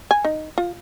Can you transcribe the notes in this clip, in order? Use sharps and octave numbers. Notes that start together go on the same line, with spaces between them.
G#5
D#4
F4